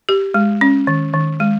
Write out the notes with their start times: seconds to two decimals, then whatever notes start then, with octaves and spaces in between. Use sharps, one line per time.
0.09 G4
0.34 G#3
0.61 C#4
0.87 D#3
1.13 D#3
1.40 G#3